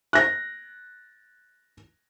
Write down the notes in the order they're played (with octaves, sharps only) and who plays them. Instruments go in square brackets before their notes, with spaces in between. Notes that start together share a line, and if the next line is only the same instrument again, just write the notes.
[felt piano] F#6 A#6